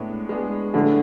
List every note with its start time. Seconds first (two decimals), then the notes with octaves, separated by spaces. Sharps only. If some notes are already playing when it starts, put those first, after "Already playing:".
Already playing: A2 G#3 B3 D4
0.29 G#3 B3 D4 G#4
0.74 A2 D3